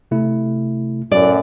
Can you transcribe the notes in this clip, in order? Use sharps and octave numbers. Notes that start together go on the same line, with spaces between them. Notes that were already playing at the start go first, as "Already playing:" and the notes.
C3 A3 E4
F#2 A2 D5